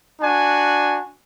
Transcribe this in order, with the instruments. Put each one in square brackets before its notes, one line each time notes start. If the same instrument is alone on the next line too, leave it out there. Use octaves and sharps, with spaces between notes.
[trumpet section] D4 F#4 G#5